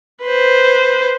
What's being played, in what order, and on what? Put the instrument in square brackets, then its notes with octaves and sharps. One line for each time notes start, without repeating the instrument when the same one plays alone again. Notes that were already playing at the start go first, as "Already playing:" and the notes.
[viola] B4 C5